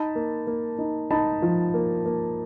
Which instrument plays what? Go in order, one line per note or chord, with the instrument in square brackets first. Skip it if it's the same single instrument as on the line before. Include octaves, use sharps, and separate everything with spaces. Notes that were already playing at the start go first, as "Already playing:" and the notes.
Already playing: [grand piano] D#4 A5 B5
A#3
A#3
D#4
D#4 A5 B5
F3
A#3
A#3